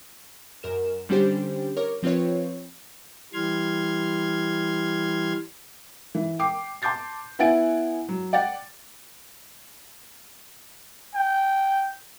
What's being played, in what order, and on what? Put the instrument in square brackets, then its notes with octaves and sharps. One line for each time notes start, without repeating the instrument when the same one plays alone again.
[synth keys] F#2 A#4 E7
D3 G3 C#4 D4 G4 C5
A#4 C#5 D6
F3 C4 F4 B4 C#5
[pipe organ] E3 G3 C6 F6 G#6
[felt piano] E3
G5 D6 C7
A5 C6 D6 G6 A6 C7
B3 E4 F#5 G#5 A6 D7
F#3
D5 F#5 G5 A6
[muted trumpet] G5